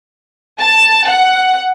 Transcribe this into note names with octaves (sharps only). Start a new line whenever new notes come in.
A5
F#5